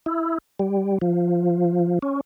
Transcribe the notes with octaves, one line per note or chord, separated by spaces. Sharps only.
E4
G3
F3
C#4